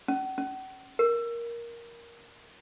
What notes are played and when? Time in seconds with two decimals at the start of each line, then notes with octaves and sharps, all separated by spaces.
0.08 C#4
0.38 C#4
0.99 A#4